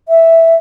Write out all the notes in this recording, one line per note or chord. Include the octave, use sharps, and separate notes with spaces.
E5